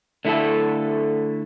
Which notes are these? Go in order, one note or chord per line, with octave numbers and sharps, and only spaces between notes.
D3 A3 E4 A4